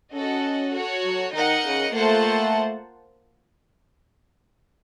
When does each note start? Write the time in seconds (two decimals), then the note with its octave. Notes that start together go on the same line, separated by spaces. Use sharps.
0.13 C#4 F#4 A4 D#5 F#5
0.73 F#4 A4 C#5
1.03 F#3
1.33 D#3 D#4 A#4 D#5 F#5
1.64 C#3
1.93 A3 A#3 F4 C5 F#5 A5